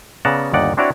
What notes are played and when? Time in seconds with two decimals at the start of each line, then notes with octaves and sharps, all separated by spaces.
0.25 C#3 B3 D5 F#5 A5 A#5
0.53 G1 D#2 D#4 D5 F#5
0.77 C4 D4 E4 F#4 C#5 D5